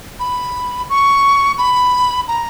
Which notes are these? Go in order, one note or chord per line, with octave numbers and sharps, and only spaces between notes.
B5
C#6
B5
A#5